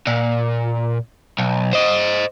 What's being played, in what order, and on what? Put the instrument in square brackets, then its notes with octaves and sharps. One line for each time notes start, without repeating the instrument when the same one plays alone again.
[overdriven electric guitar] A#2
B1
C5 D#5